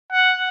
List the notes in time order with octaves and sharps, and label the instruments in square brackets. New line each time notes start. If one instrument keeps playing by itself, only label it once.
[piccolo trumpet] F#5